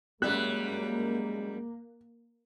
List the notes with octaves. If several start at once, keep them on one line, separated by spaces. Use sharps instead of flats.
F#2 G3 G#3 A#3 E5 F#6